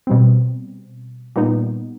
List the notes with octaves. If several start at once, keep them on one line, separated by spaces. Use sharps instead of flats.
B2 G3 C4
A#2 G3 B3 D#4